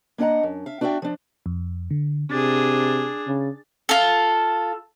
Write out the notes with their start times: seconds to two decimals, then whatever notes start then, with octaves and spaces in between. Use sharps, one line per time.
0.18 A#3 D4 D#5 F#5 A#5
0.43 F#2
0.66 E5 F5
0.81 D4 F#4 D5 E5 G5
1.02 F3 D4
1.46 F2
1.91 D3
2.31 C3 D4 G#4 A6
3.27 C#3
3.89 F4 A4